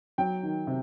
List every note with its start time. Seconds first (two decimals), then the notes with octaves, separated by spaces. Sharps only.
0.18 F#3 G5
0.43 D#3
0.67 C3